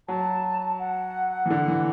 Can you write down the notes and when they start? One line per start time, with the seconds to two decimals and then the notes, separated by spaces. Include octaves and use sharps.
0.08 F#3 A5
0.79 F#5
1.46 E3
1.50 D3
1.68 E3